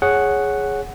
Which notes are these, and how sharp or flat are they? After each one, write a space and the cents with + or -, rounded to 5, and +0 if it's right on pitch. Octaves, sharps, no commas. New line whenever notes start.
G#4 +0 C#5 +0 F#5 +0